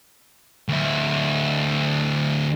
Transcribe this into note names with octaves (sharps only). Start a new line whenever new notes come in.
D2 E4